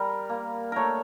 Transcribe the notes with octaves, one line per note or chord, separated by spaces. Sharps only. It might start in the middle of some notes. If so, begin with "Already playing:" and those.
Already playing: G3 A#4
A#3
A3 A#4 C#5